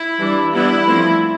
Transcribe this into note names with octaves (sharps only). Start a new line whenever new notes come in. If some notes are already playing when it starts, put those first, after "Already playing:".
Already playing: E4
E3 G3 D4
E3 G3 B3 D4 E4
F3 A3 C4